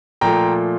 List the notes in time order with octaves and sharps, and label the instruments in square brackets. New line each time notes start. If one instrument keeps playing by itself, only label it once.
[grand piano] A#2 F3 A3 G5 A#5